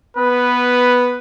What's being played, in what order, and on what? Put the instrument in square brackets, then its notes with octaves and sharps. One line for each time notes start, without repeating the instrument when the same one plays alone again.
[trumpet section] B3 B4